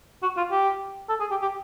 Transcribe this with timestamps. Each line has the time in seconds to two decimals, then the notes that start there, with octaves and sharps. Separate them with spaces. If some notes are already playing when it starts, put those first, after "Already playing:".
0.23 F#4
0.37 F4
0.51 G4
1.09 A4
1.20 G#4
1.31 G4
1.42 G4